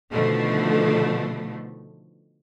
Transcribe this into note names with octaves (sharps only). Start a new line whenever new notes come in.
B2 D3 D#3 F3 A3